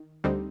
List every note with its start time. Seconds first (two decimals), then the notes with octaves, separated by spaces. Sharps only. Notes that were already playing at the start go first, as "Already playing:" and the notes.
Already playing: D#3
0.24 D2 D3 G3 C4 D#4